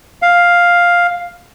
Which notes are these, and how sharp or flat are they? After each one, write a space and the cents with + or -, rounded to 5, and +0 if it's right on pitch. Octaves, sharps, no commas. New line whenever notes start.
F5 +5